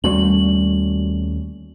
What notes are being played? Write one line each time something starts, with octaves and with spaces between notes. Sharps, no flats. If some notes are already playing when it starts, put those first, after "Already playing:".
D#2 G3 A3 C#4 F#4 F#7